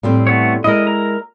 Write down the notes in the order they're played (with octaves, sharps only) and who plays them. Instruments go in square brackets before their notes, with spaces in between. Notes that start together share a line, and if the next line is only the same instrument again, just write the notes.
[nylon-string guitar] A2 G3 C4
[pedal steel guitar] A3 B3 C#5
[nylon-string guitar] G#3 E4 [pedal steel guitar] A#4 D#5
[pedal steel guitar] A#4 A#5